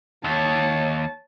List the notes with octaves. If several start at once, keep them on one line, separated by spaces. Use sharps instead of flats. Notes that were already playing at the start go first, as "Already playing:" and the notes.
D#2 C#5 A5